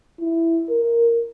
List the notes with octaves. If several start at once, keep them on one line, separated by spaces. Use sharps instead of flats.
E4
A#4